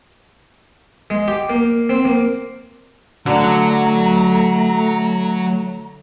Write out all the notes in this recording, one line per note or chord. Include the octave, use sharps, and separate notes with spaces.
G#3
G4
A#3
C4
A#3
D3 F#3 A3 A#5